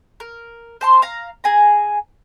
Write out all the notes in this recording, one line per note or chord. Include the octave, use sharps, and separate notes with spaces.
A#4
C5 A5 C6
F5 A#5
G#4 G#5 A#5